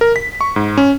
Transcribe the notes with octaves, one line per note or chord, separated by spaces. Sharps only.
A#4
B6
C#6
G#2
C#4